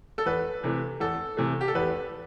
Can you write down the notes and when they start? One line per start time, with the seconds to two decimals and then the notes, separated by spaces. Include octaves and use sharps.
0.18 A4
0.26 E2 B4
0.64 C3 E3 A3
1.00 E2 A4
1.37 C3 E3 A3
1.61 G4
1.68 A4
1.75 E2 B4